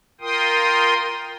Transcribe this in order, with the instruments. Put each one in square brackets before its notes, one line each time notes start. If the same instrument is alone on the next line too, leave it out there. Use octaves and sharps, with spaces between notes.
[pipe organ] F4 A#4 G5 C6 D#6